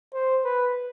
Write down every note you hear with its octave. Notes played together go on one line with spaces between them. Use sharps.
C5
B4